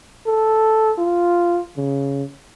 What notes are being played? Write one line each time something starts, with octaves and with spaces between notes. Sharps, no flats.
A4
F4
C#3